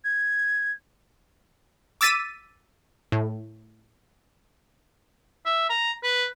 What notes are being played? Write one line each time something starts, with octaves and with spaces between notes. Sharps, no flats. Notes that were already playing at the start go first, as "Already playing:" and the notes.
G#6
D6 E6 A6 B6 D#7
A2
E5
A#5
B4